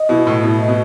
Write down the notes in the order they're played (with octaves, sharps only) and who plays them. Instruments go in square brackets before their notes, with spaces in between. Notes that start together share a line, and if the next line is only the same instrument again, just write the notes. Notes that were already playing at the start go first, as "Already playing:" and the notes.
Already playing: [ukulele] D#5
[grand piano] B2 [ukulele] E4
[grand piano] A2 [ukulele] E4
[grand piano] B2 [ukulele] E4
[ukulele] D#5
[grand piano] B2